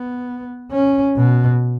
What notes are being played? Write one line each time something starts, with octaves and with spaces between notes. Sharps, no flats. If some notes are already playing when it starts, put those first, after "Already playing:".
Already playing: B3
C#4
B2